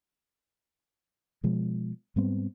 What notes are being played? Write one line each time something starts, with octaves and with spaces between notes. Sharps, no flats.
B2 F3 G#3
G#2 G3 B3 C4